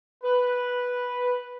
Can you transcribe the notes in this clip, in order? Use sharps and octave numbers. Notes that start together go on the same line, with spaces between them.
B4